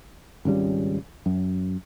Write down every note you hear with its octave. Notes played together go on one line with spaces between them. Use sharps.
G#1 C#2 C#3 G3
F#2